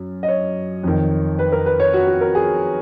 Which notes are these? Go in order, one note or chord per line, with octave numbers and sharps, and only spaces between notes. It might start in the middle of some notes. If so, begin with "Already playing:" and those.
Already playing: F#2
D#5
C#5
F2 D#3
B4
A#4
B4
C#5
F#4
F#4
A#4
G#4